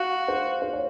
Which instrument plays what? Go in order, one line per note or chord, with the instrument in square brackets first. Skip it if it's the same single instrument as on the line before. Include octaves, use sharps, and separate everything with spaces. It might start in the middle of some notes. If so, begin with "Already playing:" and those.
Already playing: [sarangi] F#4 [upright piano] F5
[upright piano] C5
C5
C#5